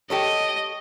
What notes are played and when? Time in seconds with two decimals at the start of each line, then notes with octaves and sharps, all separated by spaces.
0.10 G4 A4 C#5 D#5